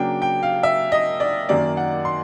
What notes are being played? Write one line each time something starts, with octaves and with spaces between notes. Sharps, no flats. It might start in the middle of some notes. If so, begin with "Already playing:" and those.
Already playing: C#3 F#3 A#3 D4 G5
G5
F5
E5
D#5
D5
F#2 D#3 F#3 A#3 D5
F#5
C6